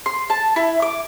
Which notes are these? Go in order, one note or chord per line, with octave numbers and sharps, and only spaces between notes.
C6
A5
E4
D6